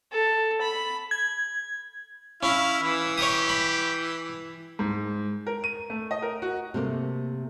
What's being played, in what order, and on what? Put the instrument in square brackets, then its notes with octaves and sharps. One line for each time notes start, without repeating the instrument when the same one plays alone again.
[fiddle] A4
B5
[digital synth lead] G#6
[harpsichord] C#4 [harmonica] E4 F5
[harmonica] E3 [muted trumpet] E4
[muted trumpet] G4 [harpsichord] C#5 D#6
[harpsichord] B5
[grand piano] G#2
A#4
D#7
A3
D#5
A#4
F#4
[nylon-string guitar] C3 A3 A#3